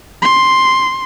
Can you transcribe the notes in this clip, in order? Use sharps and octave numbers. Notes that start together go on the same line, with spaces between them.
C6